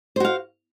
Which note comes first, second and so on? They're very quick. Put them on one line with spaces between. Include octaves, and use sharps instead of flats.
C5 F#4 F5